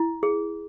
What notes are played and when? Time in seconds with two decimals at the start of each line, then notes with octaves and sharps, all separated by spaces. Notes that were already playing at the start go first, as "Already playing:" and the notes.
Already playing: E4
0.23 G#4